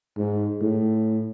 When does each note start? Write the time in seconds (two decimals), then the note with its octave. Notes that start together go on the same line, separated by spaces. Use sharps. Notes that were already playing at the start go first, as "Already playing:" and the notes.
0.17 G#2
0.61 A2